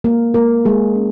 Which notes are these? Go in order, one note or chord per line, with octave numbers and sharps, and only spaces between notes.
G#3 A#3 A#4
G#3 A#3 A#4
G#3 G#4
C#4